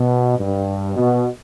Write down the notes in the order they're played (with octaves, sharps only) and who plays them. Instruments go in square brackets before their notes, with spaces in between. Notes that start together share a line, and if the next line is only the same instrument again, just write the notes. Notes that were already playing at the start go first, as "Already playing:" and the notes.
Already playing: [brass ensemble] B2
G2
B2